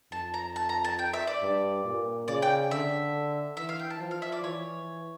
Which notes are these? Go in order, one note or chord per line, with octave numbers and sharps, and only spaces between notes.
F2 A5
A#5
A5
A#5
A5
G5
E5
D5
G2
A#2
C#3 D5
G5
D3 E5
E3 E5
F5
G5
A5
F3
F5
E5
D5
E3 C#5